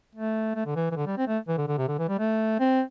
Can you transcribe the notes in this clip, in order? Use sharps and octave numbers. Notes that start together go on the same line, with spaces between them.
A3
A3
D3
E3
E3
D3
G3
C4
A3
E3
D3
D3
C3
D3
E3
G3
A3
C4